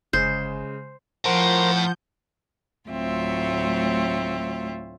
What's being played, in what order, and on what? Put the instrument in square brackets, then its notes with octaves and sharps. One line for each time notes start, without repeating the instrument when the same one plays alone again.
[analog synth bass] G1 [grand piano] C#3 G#3 [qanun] C5
[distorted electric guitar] A2 [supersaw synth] F3 G6 [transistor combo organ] A#4 C5 [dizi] F#5
[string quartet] D2 A2 F#3 C4 F4 E5